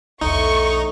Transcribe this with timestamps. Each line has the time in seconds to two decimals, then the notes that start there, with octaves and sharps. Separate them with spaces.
0.21 B1 E2 A2 D3 D#4 C6 C#6